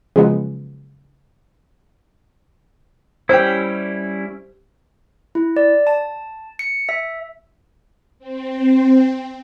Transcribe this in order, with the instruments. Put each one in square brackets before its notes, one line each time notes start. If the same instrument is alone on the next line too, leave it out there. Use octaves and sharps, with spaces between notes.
[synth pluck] C#3 F3 F#3 G#3 B3
[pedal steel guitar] G3 C#4 E4 [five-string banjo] G4 C5
[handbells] E4
D5
A5
C#7
E5
[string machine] C4